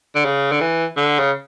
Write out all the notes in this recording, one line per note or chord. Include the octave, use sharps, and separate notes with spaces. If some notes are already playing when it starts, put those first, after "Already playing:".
D3
C#3
D3
E3
D3
C#3